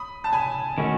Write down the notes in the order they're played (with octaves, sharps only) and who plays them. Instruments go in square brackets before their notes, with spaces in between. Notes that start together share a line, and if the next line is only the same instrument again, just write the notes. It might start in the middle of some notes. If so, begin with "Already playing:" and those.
Already playing: [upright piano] B5 D#6
A5
G#5 B5
[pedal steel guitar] D#3 A3 C#4 F#4